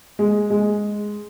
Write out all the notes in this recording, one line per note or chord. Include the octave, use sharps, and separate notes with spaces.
G#3
G#3